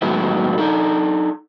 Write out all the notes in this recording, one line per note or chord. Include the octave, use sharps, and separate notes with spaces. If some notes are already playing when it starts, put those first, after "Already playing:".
A2 D#3 F#3 G#3 B3 E4
D4 D#4 A4